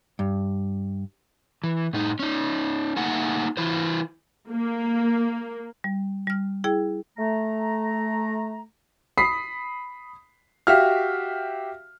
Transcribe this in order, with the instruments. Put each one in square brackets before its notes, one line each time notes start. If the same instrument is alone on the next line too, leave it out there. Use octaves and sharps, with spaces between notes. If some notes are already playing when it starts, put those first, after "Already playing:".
[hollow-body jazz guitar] G2
[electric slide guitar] E3
A2 D#4
C#4 D#4
A3 A#3 D#4 F#5 G#5
E3 E4 C5
[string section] A#3
[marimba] G3
G3 F6
E4 G#4 G5
[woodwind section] A3 A#5
[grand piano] B5 D#6 B6 C7
F#4 G4 E5 F5 F6